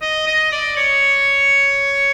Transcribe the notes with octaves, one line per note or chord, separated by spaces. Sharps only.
D#5
D#5
D5
C#5